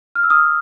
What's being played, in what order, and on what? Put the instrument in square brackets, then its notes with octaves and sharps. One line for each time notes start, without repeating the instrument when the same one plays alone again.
[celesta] F6
E6
D#6 F6